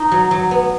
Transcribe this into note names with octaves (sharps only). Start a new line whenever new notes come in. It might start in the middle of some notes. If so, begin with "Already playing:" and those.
Already playing: D#4
F#3
F#3
B3